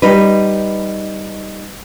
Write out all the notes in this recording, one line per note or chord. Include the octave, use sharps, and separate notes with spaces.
G3 D#4 B4